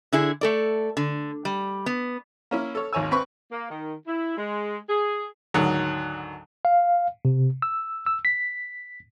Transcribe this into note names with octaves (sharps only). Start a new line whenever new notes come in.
D3 E4 G#4
A3 A4 D5
D3
G3
B3
A#3 C#4 E4
A4 C#5
G#1 D#2 C#5 G#5 E6
C4 B4 B5 C#6
A#3
D#3
E4
G#3
G#4
D2 G#2 D#3 F#3
F5
C3
E6
E6
B6